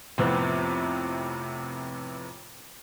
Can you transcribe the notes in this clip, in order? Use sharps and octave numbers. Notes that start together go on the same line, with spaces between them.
F2 A2 C3 F3 B3 C4